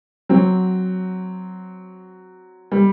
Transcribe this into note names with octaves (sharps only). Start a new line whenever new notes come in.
F#3 C4
G3